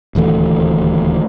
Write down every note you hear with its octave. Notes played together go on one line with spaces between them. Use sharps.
D#1 D2 E3 A3